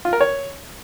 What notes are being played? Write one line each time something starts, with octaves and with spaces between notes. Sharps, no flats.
F4
A#4
C#5